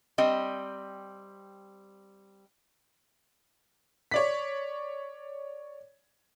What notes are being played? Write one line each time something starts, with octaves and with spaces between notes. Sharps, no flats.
G3 C4 D#5
C#5 D5 B6